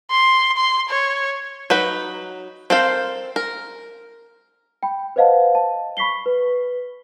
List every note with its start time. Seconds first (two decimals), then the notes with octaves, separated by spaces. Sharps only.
0.11 C6
0.57 C6
0.89 C#5
1.70 F#3 D#4 B4
2.70 C4 A4 A#4 C5 F5
3.36 A#4
4.83 G5 B5
5.16 B4 C5 D#5 F5 F#5 A5
5.55 A5
5.97 B5 C#6 B6 C7 G7
6.26 B4